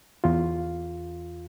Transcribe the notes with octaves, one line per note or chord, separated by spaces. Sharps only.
E2 F4